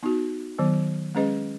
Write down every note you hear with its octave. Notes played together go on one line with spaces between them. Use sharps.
B3 D#4 F#4
D#3 F#3 B3
G#3 C#4 G#4 B4 D#5